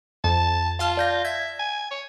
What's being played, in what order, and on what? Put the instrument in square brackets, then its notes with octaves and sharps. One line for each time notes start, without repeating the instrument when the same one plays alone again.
[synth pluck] F2 [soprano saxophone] A5
[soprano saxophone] F4 [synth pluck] F5 A5 F6
[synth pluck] D5 G6 A#6
[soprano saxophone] E5 [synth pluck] G#6
[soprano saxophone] G#5
C#5